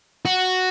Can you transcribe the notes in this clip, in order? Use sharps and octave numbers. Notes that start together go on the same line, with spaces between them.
F#4